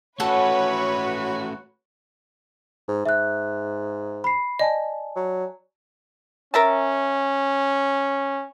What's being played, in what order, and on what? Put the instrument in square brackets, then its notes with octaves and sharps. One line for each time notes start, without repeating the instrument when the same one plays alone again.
[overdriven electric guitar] A3 C#4 [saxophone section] F#4 [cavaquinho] A4 F#5 [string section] B4 C#5
[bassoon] G#2
[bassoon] G#2 [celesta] E5 F#6
[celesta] B5 C7
[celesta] D5 G#5 A5 [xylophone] D#5
[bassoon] F#3
[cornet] C#4 [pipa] A#4 E5 A5